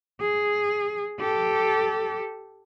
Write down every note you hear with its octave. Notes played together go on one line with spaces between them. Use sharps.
G#4
G4 A4